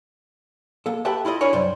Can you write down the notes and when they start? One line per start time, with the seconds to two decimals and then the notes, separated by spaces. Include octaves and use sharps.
0.86 A#3 A4
1.05 G4 A4 B4 E5 G5 A5
1.25 E4 F4 A4 D#5
1.41 D4 E4 A#4 C#5 G#5
1.53 C2 F#2 C5 D5